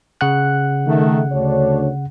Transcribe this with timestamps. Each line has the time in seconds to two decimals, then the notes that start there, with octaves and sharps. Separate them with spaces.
0.21 C#3 F#5 F#6
0.87 D#3 A3
1.32 D2 D4 C#5